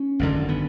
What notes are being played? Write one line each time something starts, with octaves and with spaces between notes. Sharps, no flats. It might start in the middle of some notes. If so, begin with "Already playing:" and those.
Already playing: C#4
G#1 F#2 D3
B3